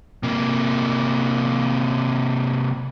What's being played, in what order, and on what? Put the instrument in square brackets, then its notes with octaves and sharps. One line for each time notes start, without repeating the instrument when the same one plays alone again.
[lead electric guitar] C3 A#3